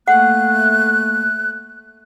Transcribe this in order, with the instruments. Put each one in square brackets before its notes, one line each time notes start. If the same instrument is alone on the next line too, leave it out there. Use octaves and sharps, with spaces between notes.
[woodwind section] A3 A#3 [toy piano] F#5 [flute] F#6